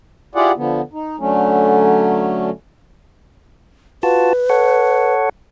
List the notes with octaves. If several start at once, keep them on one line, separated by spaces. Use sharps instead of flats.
E4 F4 G4 G#4 D5 F#5
D3 F3 B3
D#4
D3 F#3 A3 C#4
F4 F#4 B4 A5
A4 C#5 F#5